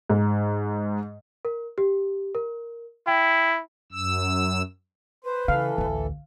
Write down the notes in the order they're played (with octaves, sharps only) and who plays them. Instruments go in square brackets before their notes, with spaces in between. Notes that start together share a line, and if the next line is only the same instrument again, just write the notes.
[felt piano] G#2
[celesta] A#4
G4
A#4
[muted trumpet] E4 [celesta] G5
[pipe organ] F#2 E6
[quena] B4 [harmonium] C5
[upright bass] C#3 [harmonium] E3 A4 [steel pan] F5
[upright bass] A1 D2